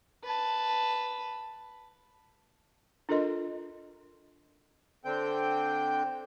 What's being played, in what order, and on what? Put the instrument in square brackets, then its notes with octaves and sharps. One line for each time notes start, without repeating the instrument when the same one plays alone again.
[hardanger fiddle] B4 A5
[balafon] D4 F4 A4 A#4 D#5 C6
[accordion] D3 C4 G5